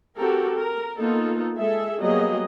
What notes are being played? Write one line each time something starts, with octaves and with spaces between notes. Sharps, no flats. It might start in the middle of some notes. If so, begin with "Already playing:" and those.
C4 F#4 G4 A4 A#4
A#4
A#3 B3 D#4 F4 A4
G#3 G#4 A4 E5
F#3 G3 A#3 B3 G#4 D#5